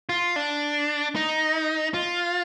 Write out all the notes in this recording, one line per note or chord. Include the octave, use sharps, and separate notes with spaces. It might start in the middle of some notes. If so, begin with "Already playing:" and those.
F4
D4
D#4
F4